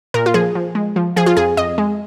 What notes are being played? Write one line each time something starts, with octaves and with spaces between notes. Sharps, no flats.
A#2 A#4
F4
F3 G#4
F3
G#3
F3
F3 G#4
F4
F2 G#4
F2 D#5
G#3